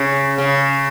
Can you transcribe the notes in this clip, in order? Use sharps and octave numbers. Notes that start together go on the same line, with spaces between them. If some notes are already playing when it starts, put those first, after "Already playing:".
Already playing: C#3
C#3